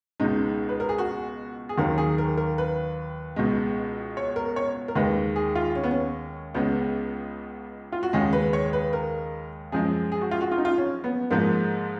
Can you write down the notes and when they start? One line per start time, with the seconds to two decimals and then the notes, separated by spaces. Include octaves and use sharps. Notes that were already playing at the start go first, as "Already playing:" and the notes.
0.20 C#2 B2 G#3 D#4
0.69 B4
0.80 A#4
0.89 G#4
0.98 F#4
1.69 G#4
1.78 D#2 D#3 F#3 A#4
1.98 G#4
2.18 A#4
2.37 A#4
2.58 B4
3.36 C#2 B2 G#3
4.17 C#5
4.36 A#4
4.56 C#5
4.88 A#4
4.96 D#2 D#3 G#3 B4
5.36 G#4
5.56 F4
5.75 C#4
5.83 B3
5.91 C#4
6.54 C#2 C#3 G#3 B3
7.92 F4
8.03 F#4
8.13 D#2 C#3 G#3 G#4
8.33 B4
8.53 C#5
8.73 B4
8.93 A#4
9.72 F#2 F3 G#3 G#4
10.12 G#4
10.21 F#4
10.31 F4
10.41 F#4
10.52 F4
10.58 D#4
10.65 F4
10.78 C#4
11.04 B3
11.31 G#2 F3 G#3 A#3